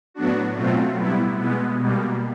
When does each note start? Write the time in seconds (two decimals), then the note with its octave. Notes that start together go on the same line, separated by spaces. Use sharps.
0.14 A2 F#3 B3 D4 F#4
0.55 B2 F#3 A3 C4 F4
0.96 G3 B3 E4
1.37 B2 G#3 B3
1.78 B2 G3 A#3